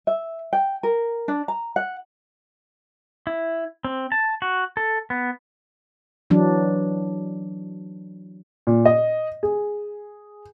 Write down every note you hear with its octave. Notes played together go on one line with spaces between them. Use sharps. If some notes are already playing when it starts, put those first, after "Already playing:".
E5
G5
A#4
D4
A#5
F#5
E4
C4
A5
F#4
A4
B3
E3 F#3 D4
A#2
D#5
G#4